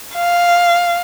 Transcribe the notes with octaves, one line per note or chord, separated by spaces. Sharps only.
F5